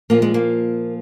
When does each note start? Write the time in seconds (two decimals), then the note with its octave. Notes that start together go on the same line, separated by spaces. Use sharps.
0.10 A#2 F3 A#3
0.22 G#3
0.34 A#3